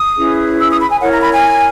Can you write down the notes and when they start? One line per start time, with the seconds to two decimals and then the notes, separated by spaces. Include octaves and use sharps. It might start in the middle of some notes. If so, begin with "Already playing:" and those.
Already playing: D#6
0.18 C#4 E4 G#4 B4
0.60 E6
0.69 D#6
0.80 B5
0.91 G#5
1.01 E4 A#4 C#5 F#5
1.11 A#5
1.21 B5
1.32 G#5